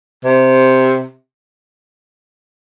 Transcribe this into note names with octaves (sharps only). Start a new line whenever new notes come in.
C3